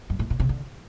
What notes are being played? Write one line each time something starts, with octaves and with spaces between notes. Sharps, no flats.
G2
A2
A#2
C3
D3